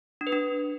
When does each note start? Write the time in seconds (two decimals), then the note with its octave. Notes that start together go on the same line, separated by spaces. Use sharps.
0.21 D4
0.27 B4
0.32 D4